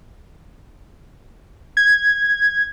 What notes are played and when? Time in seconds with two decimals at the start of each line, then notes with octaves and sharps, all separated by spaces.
1.77 G#6